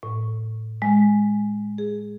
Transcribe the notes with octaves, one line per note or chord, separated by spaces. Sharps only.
A2
G#3
G#4